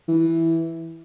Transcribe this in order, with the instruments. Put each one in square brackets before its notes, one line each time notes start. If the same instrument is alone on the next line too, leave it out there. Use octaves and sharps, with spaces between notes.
[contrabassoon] E3